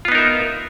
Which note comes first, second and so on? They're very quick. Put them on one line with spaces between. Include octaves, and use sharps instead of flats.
F4 B3 D#4 A#4 E5